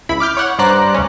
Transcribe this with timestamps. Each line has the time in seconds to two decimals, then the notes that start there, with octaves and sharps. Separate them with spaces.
0.09 C#2 E4 B5
0.20 D6 F6 G6
0.37 C#5 F#5
0.59 G2 C5 D5 A#5 F#6
0.94 D2 C#4